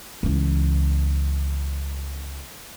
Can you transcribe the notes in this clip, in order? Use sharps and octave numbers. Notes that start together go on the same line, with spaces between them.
C#2 E3